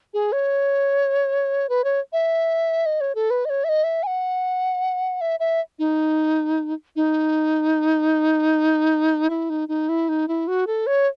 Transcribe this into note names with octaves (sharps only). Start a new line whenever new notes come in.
G#4
C#5
B4
C#5
E5
D#5
C#5
A4
B4
D#5
C#5
E5
D#5
E5
G#5
F#5
E5
E5
D#4
D#4
E4
D#4
D#4
E4
D#4
E4
F#4
A4
C#5